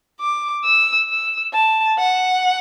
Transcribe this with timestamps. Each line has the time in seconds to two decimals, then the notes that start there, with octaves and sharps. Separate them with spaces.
0.20 D6
0.64 E6
1.09 E6
1.53 A5
1.98 F#5